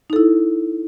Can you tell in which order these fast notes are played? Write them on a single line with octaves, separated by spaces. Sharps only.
D#4 A4 E4